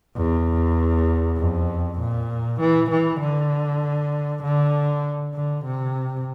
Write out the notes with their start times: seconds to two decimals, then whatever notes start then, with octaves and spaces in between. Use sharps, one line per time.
0.17 E2
1.38 F2
1.99 A#2
2.60 E3
2.91 E3
3.20 D3
4.43 D3
5.34 D3
5.65 C3